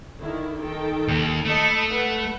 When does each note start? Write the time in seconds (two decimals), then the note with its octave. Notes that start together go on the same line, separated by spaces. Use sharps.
0.21 D3 D#3 E4
0.60 D#3 A4 G5
1.08 D#2
1.45 A3 D#5 A5 B5
1.90 B4 F#5